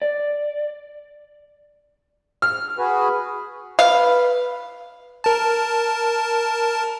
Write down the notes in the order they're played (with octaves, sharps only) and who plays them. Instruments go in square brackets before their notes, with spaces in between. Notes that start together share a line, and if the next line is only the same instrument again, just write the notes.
[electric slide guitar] D5
[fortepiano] F6
[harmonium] F#4 G#4 B4
[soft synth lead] B4 [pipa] F5
[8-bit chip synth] A#4 A5